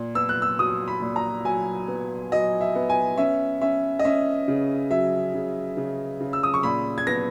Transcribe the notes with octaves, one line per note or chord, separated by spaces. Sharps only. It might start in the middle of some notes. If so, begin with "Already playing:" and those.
Already playing: A#2
B3 E6
F#6
E6
F#3 D#6
B5
A#2
A#5
F#3 G#5
B3
F#3 D#5
E5
B3
G#5
C#4 E5
C#4 E5
D#5
C#4 E5
C#3
F#3 E5
C#3
C#3
C#3
E6
D#6
C#6
A#2 B5
G#6
B3 A#6